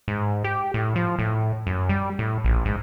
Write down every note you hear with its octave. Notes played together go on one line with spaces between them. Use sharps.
G#2
G4
A2
F3
A2
F#2
G3
A2
A#1
G#2